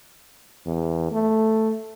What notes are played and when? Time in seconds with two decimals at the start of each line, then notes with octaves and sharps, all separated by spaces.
0.66 E2
1.11 A3